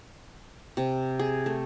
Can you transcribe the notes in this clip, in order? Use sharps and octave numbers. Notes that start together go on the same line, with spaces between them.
C3
G#4
A3